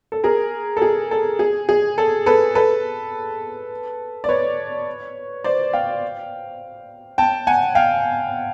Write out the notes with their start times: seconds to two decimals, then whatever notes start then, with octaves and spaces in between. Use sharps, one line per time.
0.12 A4
0.24 G#4 A#4
0.77 A4
0.82 G#4
1.11 A4
1.39 G#4
1.69 G#4
1.98 A4
2.26 A4 B4
2.55 A4 B4
4.24 D5
4.29 B4 C#5
5.44 C5 D5
5.73 F5 G5
7.18 G5 A5
7.47 F#5 G#5
7.75 F5 G5